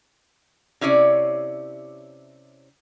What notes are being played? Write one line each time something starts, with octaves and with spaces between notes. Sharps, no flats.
C3 C#4 E4 C#5 D5